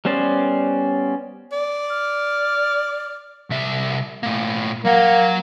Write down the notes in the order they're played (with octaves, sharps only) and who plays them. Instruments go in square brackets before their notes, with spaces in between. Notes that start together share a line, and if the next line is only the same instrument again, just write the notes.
[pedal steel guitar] G3 B3 C#4 C5 D5
[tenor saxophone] D5
[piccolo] F6
[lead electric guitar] C2 E5
A2 A#3
[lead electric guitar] F#3 F#5 [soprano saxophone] A#3